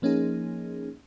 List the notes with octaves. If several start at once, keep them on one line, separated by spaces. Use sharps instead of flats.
F3 A#3 C#4 D#4 G#4